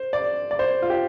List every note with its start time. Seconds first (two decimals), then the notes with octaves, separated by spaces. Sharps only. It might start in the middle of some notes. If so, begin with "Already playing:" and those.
Already playing: C5
0.13 D5
0.51 D5
0.59 C5
0.82 F4
0.90 G4